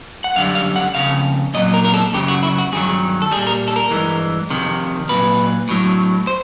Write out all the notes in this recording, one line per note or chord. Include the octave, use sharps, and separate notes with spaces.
F#5
F#2 D3 G3 F5
F5
F#5
F2 C#3 F5
A#2 F#3 D#5
A#4
A#4
A4
F#2 C#3 F#3 G4
F#4
E4
F#4
G2 D#3 F#3 G#4
A4
A#2 G3 G#4
A#4
A4
A#4
G2 E3 G#3
F2 C3 D#3
A#2 F#3 B4
A2 F#3
C5